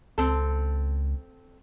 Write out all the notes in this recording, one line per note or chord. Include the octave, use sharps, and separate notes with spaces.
C#2 C4 A4